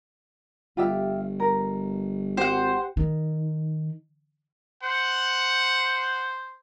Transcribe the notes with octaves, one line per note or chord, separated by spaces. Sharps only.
G1 F4 G4 E5
A#4
G#1 G4 C5 F#5
D#3
C5 F#5